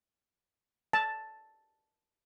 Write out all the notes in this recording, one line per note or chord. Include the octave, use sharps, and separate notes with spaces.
A5